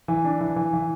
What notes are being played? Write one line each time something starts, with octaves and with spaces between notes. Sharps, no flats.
E3
D4
E3
E3
E3